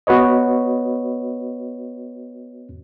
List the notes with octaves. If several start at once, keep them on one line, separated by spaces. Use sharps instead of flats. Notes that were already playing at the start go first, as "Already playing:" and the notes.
B3 F#4 B4 C#5 D#5